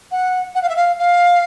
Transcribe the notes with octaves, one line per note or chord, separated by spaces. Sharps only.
F#5
F#5
F5
E5
F5
F5